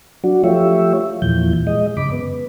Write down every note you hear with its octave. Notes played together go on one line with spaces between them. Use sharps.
F#3 D4 F#4
F3 A3 F4 G4 C#5 E5
E2 A#2 E3 F3 G6
G#3 D#5
F#2 C#3 B5 D6
B3